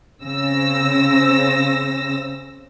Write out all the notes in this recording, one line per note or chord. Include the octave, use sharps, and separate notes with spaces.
C#3 C4 E6 A#6